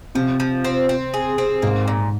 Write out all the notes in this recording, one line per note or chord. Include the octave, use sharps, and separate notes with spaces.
C3 F3
F3
C4
C4
G#4
C4
G#2 A#3
A#2